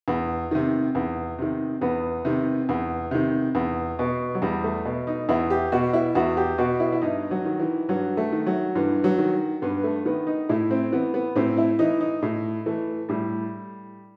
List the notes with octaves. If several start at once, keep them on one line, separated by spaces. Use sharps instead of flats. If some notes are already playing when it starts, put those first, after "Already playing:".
E2
C3 D#3
E2
C3 D#3
E2 B3
C3 D#3
E2
C3 D#3
E2
B2
F#3
E2 G3
A3
B2
D#4
E2 E4
G4
B2 F#4
E4
E2 F#4
G4
B2 F#4
E4
E4
G2 D#4
F#3
D#3
E3
G2 F#3
A3
D#3
F#3
G2 E3
F#3
D#3
G2 B3
A3
D#3 B3
D#4
A2 E4
C4
E3 B3
B3
A2 C4
E4
E3 D#4
D#4
A2
E3 A3
A2 G3